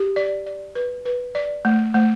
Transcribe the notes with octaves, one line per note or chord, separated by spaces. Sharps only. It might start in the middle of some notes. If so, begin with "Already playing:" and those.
Already playing: G4
D5
D5
B4
B4
D5
A3
A3